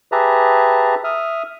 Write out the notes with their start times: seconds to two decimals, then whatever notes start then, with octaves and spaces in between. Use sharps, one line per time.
0.12 G4 G#4 B4 E5 A5 A#5
1.04 E5 D#6 F6